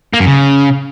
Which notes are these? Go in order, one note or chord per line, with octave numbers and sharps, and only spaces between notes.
A#3
F#2
C#3